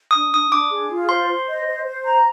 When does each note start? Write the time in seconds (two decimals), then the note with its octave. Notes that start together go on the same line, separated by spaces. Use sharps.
0.11 D4 D#6
0.33 D4 D#6
0.51 D4 D6
0.71 G#4
0.90 F4
1.09 C5 C6
1.28 C5
1.46 D#5
1.66 C5
1.84 C5
2.04 A#5